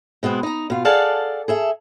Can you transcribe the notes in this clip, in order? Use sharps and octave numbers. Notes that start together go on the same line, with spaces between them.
B2 G#3 B3 C4
D#4 A#5
B2 F4
G#4 A4 D5 F5 F#5 A5
G#4 A4 E5